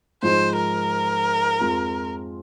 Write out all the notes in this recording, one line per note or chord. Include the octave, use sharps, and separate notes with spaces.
G#2 F3 G#3 D#4 C5
A#4
F2 F3 G#3 F4